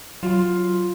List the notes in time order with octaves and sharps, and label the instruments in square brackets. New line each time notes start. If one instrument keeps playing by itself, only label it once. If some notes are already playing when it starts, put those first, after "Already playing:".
[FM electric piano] F#3 [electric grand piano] F4 C6